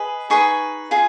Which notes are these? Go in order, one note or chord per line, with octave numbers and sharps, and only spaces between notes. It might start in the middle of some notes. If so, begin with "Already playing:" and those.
Already playing: G#4 B4 D#5
D#4 G#4 B4 C#6
F4 G#4